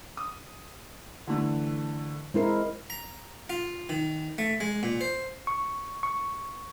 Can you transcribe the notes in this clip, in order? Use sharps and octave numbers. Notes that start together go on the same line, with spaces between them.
D#6
D3 E3 A3
G#3 C4 E4 A#4 C7
A#5
F4
D#3
A3
G#3
A#2
C5
C#6
C#6